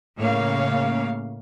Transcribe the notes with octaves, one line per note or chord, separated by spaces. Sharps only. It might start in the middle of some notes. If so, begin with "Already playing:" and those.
A2 C#3 A#3 C#5 F5